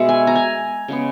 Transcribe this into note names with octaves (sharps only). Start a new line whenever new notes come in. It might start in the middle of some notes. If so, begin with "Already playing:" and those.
Already playing: B2 G#3 B3 E5
G#5
A#5
G#5
C#3 G#3 B3